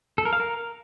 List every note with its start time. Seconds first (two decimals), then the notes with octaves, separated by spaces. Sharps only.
0.18 A4
0.25 A#4
0.33 F5
0.40 A#4